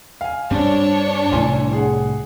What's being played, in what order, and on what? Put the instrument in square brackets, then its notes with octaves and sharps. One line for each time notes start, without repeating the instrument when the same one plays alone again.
[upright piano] F5 G#5
[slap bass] G2 G3 [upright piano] C4 [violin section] D4 C#5
[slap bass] C2 A2 [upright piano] E3 G#5 C6
[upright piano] G#4 F#5